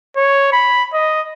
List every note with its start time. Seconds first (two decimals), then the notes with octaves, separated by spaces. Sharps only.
0.16 C#5
0.53 B5
0.93 D#5